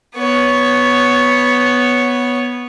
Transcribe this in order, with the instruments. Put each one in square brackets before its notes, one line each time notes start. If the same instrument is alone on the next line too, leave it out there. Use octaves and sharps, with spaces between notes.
[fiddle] B3 C#5